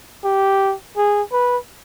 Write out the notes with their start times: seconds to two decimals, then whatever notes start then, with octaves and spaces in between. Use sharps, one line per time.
0.24 G4
0.97 G#4
1.32 B4